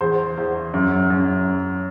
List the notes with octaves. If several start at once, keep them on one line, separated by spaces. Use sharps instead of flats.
E2 C5
E2
F#2
F#2